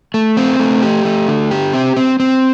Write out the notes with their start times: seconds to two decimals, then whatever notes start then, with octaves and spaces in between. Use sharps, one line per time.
0.14 A3
0.37 C4
0.59 A3
0.82 G4
1.05 A3
1.28 D3
1.51 G4
1.73 C4
1.97 C4
2.20 C4